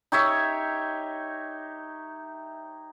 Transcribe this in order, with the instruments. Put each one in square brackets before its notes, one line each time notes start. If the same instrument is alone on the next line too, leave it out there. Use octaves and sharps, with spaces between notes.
[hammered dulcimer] D#4 G4 C#5 E5